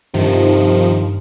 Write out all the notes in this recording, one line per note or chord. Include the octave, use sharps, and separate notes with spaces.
G2 C3 D#3 F3